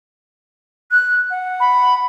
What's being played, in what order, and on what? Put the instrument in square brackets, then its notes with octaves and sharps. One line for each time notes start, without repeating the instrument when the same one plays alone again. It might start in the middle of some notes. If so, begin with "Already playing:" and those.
[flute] F#6
F#5
[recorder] B5